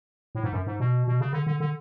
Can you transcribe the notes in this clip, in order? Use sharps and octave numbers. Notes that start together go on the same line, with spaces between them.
A2
G#2
F#2
G#2
B2
B2
C#3
D3
D3
D3